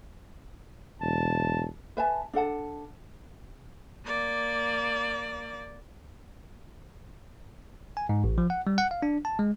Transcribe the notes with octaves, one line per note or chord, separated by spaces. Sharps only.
E1 A5
B4 E5 G#5 A5
D4 A4 F#5 A5
A#3 D5
G#5
G#2
A1
F3
F#5
G3
F#5
F5
D4
A5
G#3